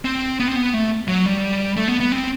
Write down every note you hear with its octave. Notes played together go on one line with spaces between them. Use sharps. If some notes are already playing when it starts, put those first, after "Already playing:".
C4
B3
C4
B3
A3
F#3
G3
A3
B3
B3
C4